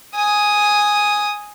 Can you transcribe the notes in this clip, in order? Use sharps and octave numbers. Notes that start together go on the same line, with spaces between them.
G#5 D#6